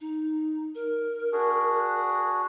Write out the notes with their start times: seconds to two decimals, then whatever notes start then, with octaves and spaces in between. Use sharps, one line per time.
0.01 D#4
0.75 A#4
1.32 D4 F#4 G#4